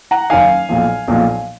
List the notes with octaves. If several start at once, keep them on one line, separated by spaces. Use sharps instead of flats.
F#5 A#5
F#1 F#2 D#3 F5 G#5
B1 A#2 F3
B1 A#2 F3